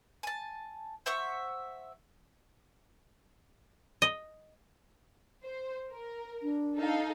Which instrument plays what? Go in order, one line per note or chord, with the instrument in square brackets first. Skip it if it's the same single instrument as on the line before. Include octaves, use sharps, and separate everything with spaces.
[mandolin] G#5 A5
C5 E5 F#5 C#6
[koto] D#5
[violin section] C5
A#4
[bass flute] D4
[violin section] D#4 A4 F5